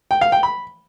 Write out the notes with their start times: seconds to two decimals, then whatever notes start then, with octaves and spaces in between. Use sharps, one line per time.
0.11 G5
0.21 F5
0.32 G5
0.43 B5